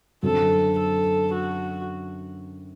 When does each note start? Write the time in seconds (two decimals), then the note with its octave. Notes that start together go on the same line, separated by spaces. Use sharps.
0.23 F#2 D3 F#3 C4 F#4 A4
0.78 A4
1.33 F#4